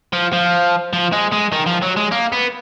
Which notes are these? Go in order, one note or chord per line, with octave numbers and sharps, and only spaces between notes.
F3
F3
F3
G#3
G#3
D#3
F3
F#3
G#3
A#3
B3